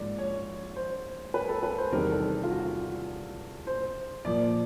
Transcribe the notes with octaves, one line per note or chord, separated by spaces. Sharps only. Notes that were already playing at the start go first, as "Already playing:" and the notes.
Already playing: G#2 F3 A#3 D5
C#5
C5
B4
A4
B4
C5
E2 C3 D#3 G3 A#4
A4
F4
F#4
C5
A#2 F3 A#3 D5